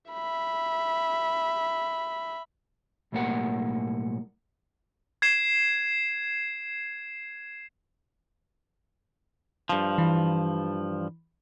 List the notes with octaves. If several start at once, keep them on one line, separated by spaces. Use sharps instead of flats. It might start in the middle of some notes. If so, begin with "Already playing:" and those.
E5 B5
B1 A2 G3 A#3 A#4 F#5
G#6 C7 E7
G2 F3
E3